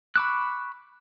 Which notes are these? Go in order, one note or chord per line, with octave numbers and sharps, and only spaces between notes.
B5 C#6 D6 E6 F#6